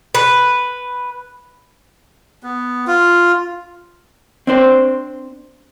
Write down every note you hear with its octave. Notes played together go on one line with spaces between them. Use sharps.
B4
B3
F4
C4 D4 C5